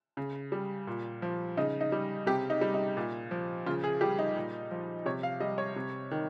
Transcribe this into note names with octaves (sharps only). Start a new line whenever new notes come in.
C#3
G3
A#2
F3
C#3 D#4
D#4
G3
C3 G4
D#4
G3
D#4
A#2
F3
C#3 F4
G#4
G3 G4
D#4
A#2
F3
C3 C#5
F5
G3 D#5
C#5
C3
D#3